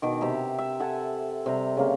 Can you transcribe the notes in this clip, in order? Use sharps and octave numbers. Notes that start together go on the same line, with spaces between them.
B2 D#3 D6
C3 G4 E5 A#5
E5
A4 F#5 G#5
C3 G3 A#5
C#3 A#3